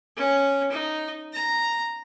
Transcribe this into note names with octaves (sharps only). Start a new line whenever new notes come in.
C#4
D#4
A#5